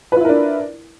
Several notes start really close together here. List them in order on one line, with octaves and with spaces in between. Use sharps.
B4 F4 E4 A#4 D4